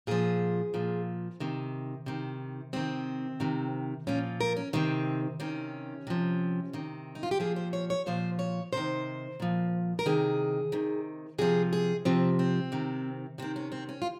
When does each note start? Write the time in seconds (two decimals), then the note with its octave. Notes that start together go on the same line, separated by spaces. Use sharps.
0.07 A#2 F3 G#4
0.74 A#2 F3
1.40 C3 D#3
2.06 C3 D#3
2.73 C3 D#3 C4
3.40 C3 D#3
4.07 A#2 F3 C#4
4.41 A#4
4.57 C#4
4.73 C3 D#3 C4
5.40 C3 D#3 C#4
6.07 C3 F3
6.73 C3 D#3
7.15 D#4
7.23 F4
7.31 G4
7.40 A#2 F3 G#4
7.56 C5
7.73 C#5
7.90 C#5
8.06 A#2 F3 C5
8.39 C#5
8.73 C3 D#3 C5
9.40 A#2 F3
9.99 A#4
10.06 C3 D#3 G#4
10.72 C3 D#3
11.38 C3 F3 G#4
11.73 G#4
12.05 C3 F3 C4
12.39 C4
12.72 C3 D#3
13.38 C3 D#3 C4
13.56 C#4
13.72 C4
13.89 C#4
14.02 F4